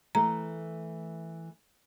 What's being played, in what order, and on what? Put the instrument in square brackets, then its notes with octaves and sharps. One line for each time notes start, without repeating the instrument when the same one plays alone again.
[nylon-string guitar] E3 A3 [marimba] A#5